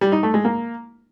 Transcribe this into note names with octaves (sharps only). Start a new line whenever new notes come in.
G3
D#4
A3
G#3
A#3